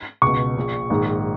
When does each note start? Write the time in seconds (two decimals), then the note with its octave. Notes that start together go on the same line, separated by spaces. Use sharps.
0.22 C#2 B2 C#6
0.57 A#1 A#2
0.90 A#1 G#2 D#3